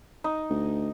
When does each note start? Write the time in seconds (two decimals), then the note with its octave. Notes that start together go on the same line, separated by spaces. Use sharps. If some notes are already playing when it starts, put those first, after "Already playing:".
0.24 D#4
0.50 D2